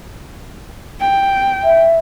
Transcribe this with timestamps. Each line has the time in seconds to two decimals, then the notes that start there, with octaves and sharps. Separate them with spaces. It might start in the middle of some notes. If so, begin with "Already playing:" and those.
1.00 G5
1.64 E5